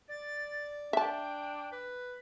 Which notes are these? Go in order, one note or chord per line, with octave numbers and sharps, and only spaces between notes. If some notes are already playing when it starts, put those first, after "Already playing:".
D5 A6
D4 E5 G5 A5
B4